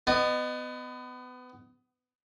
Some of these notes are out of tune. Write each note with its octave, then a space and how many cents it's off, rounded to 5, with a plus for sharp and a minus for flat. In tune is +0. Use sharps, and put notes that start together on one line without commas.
B3 +30 D#5 -20